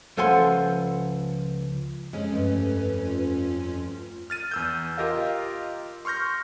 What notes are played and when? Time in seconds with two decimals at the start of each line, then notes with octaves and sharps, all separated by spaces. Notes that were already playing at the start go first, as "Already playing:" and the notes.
0.17 C#2 F3 A4 F#5 G#5 C6
2.13 F2 G#3 C#4
2.33 G2 A3 B4
3.05 F4
4.30 F6 A6 D#7
4.51 E2 E6 G6
4.97 F4 G4 A#4 D#5 F5
6.05 C6 C#6 F6 G6 A#6